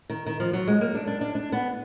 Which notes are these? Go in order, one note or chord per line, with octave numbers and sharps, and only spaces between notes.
D#3
D#3
F3
F#3
G#3
A#3
D4
D4
D4
D4
B3